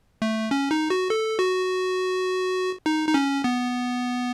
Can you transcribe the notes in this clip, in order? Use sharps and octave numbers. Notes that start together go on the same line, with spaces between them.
A3
C#4
D#4
F#4
A4
F#4
D#4
D#4
C#4
B3